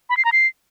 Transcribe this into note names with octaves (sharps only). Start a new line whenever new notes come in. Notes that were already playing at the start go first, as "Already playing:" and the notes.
B5
C7
A#5
C7